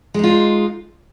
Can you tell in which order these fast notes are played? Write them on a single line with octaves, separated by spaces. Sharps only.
G#3 D#4 F4